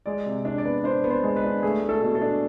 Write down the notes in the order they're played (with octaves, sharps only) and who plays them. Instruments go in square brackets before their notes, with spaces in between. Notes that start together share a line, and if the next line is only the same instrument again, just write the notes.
[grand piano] G#3 D5
C3
D4
D5
B3
D4 C5
B3
C5
G#3
B4
D4
A3 G#4
A3
A4
B2
A4
D4